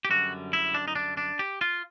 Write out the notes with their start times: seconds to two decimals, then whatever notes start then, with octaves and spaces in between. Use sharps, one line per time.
0.05 G4
0.10 F#2 D3 G3 F#4
0.53 E4
0.74 D4
0.88 D#4
0.95 D4
1.17 D4
1.39 G4
1.61 F4